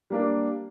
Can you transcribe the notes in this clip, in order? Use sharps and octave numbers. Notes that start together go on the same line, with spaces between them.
G3 A#3 D4